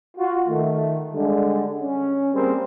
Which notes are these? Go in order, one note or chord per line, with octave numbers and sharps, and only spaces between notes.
F4 F#4
D#3 A3
D3 G3 G#3
C#4
G3 A#3 C4 G#4 A#4 C5